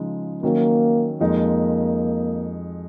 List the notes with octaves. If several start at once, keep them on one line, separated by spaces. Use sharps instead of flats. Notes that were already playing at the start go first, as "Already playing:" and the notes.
Already playing: C#3 F3 G#3 D#4
D#3 F#3 A#3 C#4
F2 F3 G#3 A#3 D#4